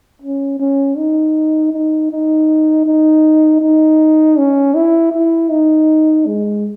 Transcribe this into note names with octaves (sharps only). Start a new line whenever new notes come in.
C#4
C#4
D#4
D#4
D#4
D#4
D#4
C#4
E4
E4
D#4
G#3